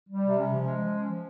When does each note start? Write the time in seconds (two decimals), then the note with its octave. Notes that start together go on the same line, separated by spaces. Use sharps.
0.08 G3
0.23 C3
0.37 C#4
0.51 F3
0.65 G#3
0.81 F3
0.95 C#4
1.09 F3